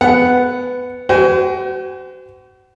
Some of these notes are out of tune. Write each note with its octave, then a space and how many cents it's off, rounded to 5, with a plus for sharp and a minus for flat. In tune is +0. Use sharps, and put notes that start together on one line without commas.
B3 +15 F#5 +0
F#4 +35 C5 -40 G#5 -20